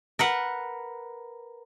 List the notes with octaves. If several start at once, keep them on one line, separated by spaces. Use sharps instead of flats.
A#4 B4 F#5